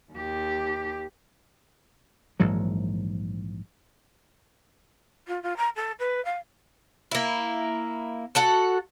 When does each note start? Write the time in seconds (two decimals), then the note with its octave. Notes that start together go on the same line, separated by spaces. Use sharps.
0.13 D#2 G4
2.40 A#1 G#2 E3 F#3
5.27 F4
5.42 F4
5.56 A#5
5.75 A4
5.99 B4
6.24 F5
7.11 A#3 E4
8.35 F#4 A4 F#5